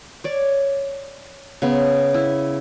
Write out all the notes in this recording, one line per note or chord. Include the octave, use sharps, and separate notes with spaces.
C#5 D5
C#3 B3
E4